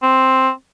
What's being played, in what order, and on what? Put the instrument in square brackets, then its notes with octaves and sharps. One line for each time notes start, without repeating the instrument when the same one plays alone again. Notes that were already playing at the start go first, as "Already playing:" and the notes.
[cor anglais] C4